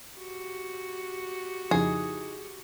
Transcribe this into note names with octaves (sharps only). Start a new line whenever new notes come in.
F#4 G4
F2 C#3 F3 D#4 E4 G#4